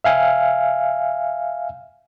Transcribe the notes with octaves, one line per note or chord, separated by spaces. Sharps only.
E5 F5 G#5